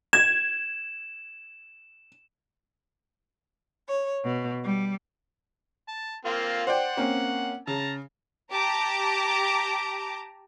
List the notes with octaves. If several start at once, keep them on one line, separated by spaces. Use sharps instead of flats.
G#6 E7
C#5
B2
G3
A5
A#3 C4 F4
C5 D5 F#5 G5
A#3 C4 C#4
C#3 A5 A#5
G4 A5 A#5 D6